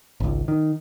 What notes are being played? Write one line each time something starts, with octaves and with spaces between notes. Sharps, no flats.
G#1 C#2
D#3